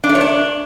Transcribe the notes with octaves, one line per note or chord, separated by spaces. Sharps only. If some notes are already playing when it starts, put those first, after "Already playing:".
D4
A3
C#5
D4